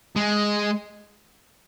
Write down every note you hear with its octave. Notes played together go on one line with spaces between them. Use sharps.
G#3